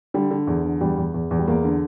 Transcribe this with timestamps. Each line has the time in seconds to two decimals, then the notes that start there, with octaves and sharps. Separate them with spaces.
0.14 D3 G3
0.31 D3
0.47 E2
0.64 D3
0.81 E2 G3
0.98 E2
1.14 E2
1.31 E2
1.39 G3
1.48 E2 A#3
1.64 D3